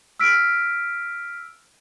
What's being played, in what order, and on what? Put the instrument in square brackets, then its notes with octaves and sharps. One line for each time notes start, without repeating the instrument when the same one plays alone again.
[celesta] E6 F6 B6 D7